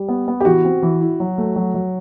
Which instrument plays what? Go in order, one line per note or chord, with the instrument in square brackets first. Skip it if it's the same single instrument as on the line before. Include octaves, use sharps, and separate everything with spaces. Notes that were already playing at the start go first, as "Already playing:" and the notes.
Already playing: [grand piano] G3
B3
B3
[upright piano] G4
[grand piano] E3 [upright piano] F#4
[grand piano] C4
E3
E4
F#3
A3
F#3
F#3